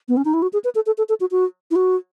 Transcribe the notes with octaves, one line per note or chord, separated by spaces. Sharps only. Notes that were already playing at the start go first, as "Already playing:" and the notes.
B3
C#4
D#4
E4
F#4
G#4
B4
A4
A4
A4
A4
F#4
F#4
E4
F#4